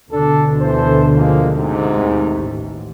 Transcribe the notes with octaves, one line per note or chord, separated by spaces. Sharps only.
D2 B2 D3 D4 A4
E3 A4 C5
F3 G#3 A#3
G#2 C3
D#2 A3
A1